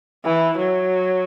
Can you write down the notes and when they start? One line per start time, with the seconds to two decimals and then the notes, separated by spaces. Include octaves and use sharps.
0.25 E3
0.58 F#3